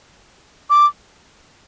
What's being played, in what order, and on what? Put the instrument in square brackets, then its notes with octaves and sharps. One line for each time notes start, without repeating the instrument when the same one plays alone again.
[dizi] D6